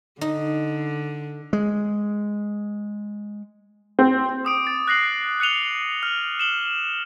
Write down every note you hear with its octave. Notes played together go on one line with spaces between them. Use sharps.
D3 D#4
G#3
C4
D6 D#6 D7
A6
F#6 A#6 C7 F#7
F#6 C#7 D#7 F7 G7
F6 F#7
E7 F#7 G7